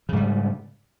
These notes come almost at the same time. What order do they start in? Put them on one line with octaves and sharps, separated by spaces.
C#3 G#2 G3